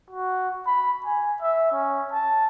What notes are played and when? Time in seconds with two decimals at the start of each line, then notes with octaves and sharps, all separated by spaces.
0.10 F#4
0.66 B5
1.06 G#5
1.41 E5
1.72 C#4
2.12 A5